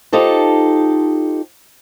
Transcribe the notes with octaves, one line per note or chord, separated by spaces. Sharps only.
D#4 F4 G4 A4 C5